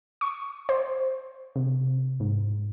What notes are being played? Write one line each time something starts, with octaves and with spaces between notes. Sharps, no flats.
C#6
C5
C3
G#2